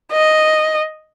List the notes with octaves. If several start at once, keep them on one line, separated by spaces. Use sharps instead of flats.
D#5